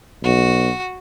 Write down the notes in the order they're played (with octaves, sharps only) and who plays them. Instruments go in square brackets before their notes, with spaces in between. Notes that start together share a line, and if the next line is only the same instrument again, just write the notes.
[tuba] B1 [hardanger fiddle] F#4